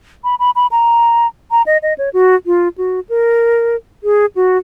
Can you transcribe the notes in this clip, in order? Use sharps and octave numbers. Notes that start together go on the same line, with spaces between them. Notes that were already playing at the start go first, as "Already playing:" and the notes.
B5
B5
B5
A#5
A#5
D#5
D#5
C#5
F#4
F4
F#4
A#4
G#4
F#4